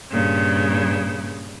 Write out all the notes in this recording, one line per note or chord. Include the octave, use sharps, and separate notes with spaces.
G2 A#2 C#3